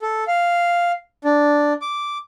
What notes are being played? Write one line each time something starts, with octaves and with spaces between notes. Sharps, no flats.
A4
F5
D4
D6